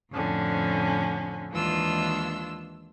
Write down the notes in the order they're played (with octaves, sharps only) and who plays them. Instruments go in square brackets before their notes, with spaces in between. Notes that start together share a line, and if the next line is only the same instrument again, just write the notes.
[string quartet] F2 A2 D3 C#4
D#2 E3 G#3 D4 F4 E6